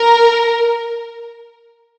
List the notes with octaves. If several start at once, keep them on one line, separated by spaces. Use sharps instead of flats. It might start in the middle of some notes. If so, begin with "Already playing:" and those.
Already playing: A#4